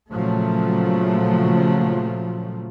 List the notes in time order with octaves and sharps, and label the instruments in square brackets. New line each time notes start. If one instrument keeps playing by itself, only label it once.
[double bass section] A#2 C#3 F3 F#3 A3